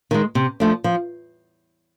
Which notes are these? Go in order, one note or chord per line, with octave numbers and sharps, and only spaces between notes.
D#3 G#3
C3
F3 A3 D4
F3